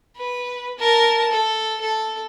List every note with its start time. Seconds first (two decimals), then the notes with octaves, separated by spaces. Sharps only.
0.16 B4
0.78 A#4 A5
1.31 A4
1.80 A4